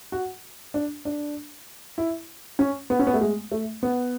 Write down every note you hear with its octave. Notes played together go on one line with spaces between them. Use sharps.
F#4
D4
D4
E4
C#4
B3
C#4
B3
A3
G#3
A3
B3